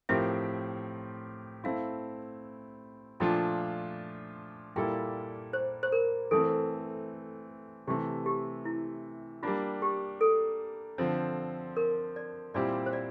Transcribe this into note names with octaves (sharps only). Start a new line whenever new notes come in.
A2 F3 C4 G4 A#4 E5
A3 C4 E4 F5
A#2 F3 A3 D4 F4 G5
A#2 G3 A#3 E4 A4 G5
C5
C5
A#4
E3 A3 C4 A4
C3 E3 A3 G4
G4
E4
G3 A#3 D4 F4
G4
A4
D3 F3 C4
A#4
D5
A#2 G3 C4 E4 G4 D5
C5
D5